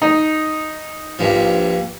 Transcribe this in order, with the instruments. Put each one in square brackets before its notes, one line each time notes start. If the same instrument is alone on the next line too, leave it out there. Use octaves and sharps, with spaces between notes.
[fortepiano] D#4
[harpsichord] A#1 G2 F3